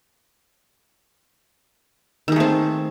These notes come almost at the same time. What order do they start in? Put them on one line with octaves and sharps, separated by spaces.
D#3 G#4 A3 C4